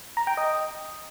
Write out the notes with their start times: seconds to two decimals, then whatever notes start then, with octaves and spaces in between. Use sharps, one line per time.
0.17 A#5
0.27 G5
0.37 D#5